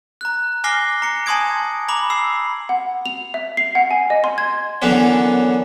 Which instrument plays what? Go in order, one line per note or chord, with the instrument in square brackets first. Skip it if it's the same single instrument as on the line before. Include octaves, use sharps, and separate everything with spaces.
[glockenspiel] A#5 F#6
G#5 D6 F6 A#6 C7 G7
A#5 C#7
G#5 A5 C6 D#6 G#6 D7
A#5 B5 D6 F#7
E6 C7
[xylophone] F#5
F7
E5
C7
F#5
G#5
D#5
C6
G#6
[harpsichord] F#2 D3 E3 B3 C#4 D4